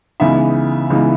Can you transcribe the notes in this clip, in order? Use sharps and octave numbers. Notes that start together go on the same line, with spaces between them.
C#2 C#3 E3 B3 D#4 E5
C#2 C#3 E3 B3 D#4